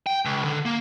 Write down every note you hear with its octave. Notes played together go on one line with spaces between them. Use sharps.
G5
C#2
D3
A#3